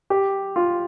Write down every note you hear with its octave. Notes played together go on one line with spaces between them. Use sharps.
G4
F4